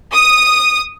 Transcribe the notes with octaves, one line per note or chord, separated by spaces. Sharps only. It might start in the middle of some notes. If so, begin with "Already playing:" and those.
D#6